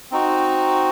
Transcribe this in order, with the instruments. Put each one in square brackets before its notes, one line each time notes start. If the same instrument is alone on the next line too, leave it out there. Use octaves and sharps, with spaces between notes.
[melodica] C4 D#4 F#4